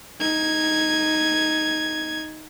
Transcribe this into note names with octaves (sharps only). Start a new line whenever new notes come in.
D#4 G#6